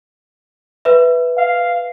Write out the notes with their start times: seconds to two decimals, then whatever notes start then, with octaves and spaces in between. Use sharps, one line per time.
0.85 B4 E5
1.37 F5